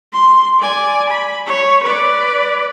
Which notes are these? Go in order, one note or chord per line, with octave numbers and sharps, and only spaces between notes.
C6
D5 G#5
B5
C#5
B4 D5